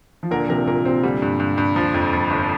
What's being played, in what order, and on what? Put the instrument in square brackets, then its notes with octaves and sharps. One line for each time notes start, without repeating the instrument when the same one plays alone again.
[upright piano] F3
[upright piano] A#2 D3 [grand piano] A#4
[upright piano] C3 F3 [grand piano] A#4
[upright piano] A#2 [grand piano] A#4
[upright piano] C3 [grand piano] C4
[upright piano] A#2 D3 [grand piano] G3
[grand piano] G2
G2
G2
F3
F2
F2
G1